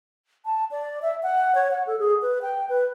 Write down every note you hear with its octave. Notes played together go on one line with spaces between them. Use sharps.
A5
D5
E5
F#5
C#5
F#5
A4
G#4
B4
G5
B4